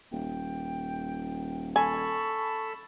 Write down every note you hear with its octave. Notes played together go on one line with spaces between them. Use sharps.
D#1 G5
A4 G#5 A5 B5 C#6